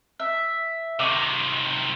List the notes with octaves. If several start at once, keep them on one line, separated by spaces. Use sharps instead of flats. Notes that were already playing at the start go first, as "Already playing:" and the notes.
E5
C3 D#3 C#6 D6